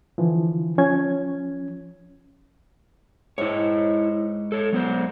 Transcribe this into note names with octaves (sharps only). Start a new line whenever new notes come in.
D3 E3 F3
F3 C#4 G#6
G#2 E4 C#5
A4 C#5
F#3 B3 C5